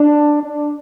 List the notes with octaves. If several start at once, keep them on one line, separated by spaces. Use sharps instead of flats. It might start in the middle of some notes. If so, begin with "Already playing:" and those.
Already playing: D4
D4